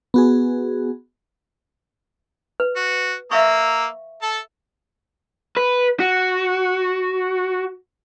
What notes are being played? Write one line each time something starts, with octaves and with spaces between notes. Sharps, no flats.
B3 F#4 G#4
B4
F#4
A#3 E5 F5 A#5 C#6 E6
A4 A5
B4
F#4